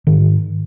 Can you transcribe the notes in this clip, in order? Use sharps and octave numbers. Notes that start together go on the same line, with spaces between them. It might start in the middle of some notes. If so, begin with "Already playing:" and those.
G#2 D#3